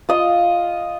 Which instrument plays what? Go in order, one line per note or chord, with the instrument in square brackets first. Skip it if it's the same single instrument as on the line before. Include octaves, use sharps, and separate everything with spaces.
[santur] F4 D#5